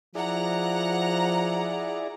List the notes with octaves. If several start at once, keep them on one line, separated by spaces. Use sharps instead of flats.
F3 E4 G#4 D5 F#5 A#5